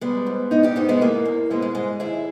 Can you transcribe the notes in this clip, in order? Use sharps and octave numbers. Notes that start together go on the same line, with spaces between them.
G3 G#3 B3
G#2
G#2 B3 D#4
D#4 G4
G#2 B3 D#4
G#3 B3
E3 A#3
E2
G#2 G#3 B3
G#3
G#2 G#3
D#2 E4 G#4